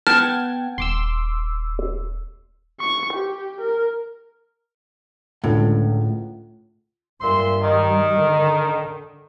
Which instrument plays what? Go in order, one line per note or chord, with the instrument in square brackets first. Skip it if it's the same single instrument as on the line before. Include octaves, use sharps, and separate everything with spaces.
[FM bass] B3 [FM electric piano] F#5 G5 G#6 [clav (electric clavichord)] A5 [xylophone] F6
[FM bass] D#1 [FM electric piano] C6 D6 E6
[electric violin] C#6
G4
A#4
[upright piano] C#2 D3 [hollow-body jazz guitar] A2
[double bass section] G2 G3 [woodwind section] A#2 E5 C6
[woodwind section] D#3
[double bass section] D3